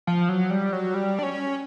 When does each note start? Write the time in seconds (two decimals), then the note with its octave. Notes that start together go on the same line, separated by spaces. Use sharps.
0.07 F3
0.29 F#3
0.50 G3
0.73 F#3
0.94 G3
1.19 D4
1.23 C#4